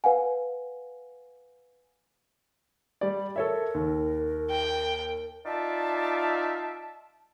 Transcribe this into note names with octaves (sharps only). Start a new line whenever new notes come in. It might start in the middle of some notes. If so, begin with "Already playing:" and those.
B4 F5 F#5 G#5
G3 D5
A4 A#4 C#5 E5
D#2
G5
D#4 F4 D5 E5 F5 A5